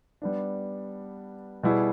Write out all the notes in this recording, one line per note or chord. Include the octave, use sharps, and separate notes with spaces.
G3 B3 D4
B2 G3 B3 E4 G#4